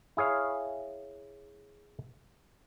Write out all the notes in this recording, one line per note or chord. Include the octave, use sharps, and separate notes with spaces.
E4 G#4 C#5 F5